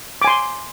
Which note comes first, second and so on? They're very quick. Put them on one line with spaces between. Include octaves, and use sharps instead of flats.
D6 G#5 C6